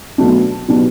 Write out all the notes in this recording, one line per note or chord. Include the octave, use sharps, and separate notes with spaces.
B2 F#3 A3 D4
B2 F#3 B3 D4 G4